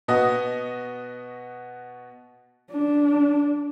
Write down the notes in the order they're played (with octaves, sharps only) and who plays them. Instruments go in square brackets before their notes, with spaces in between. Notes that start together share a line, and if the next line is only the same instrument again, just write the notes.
[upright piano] B2 B3 F#4 D#5 D#6 A#6
[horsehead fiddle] D4